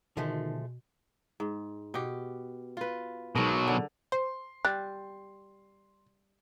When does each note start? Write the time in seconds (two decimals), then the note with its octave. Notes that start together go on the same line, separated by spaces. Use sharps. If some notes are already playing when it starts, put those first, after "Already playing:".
0.17 B2 D3 D#3 F3 G#3 A3
1.40 G#2
1.94 B2 G4
2.77 F4 B4
3.36 G#2 B2 F#3 A#4
3.68 D3
4.12 C5 C6
4.65 G3 F#6